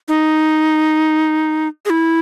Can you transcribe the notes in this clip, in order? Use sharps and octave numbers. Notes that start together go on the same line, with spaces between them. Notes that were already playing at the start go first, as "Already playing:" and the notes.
D#4
G#4
E4